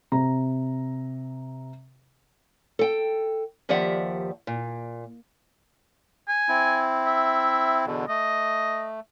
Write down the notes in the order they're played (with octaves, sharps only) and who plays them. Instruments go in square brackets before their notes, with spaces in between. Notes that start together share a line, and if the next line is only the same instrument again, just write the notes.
[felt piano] C3 A#5
[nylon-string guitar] A4 G5
D#2 F3 G4 D5 E5 F#5
A#2
[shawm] G#5
[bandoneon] C4 E4
[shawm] E5
[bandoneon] E2 B2 D3
[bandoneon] A3 [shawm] D#5